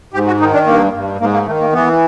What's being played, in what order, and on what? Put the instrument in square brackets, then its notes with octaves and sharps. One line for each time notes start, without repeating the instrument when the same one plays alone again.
[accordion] G#2 G4
F#4
D#3 D#4
D4
G2 A#3
G2
G#2 A#3
A#3
D#3 A3
A#3
E3 B3